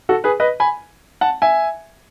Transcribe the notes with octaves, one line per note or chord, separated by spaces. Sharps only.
F#4 A4
G#4 B4
B4 D#5
G#5 B5
F#5 A5
E5 G#5